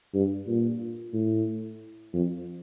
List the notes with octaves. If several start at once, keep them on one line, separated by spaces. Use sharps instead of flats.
G2
A#2
A2
F2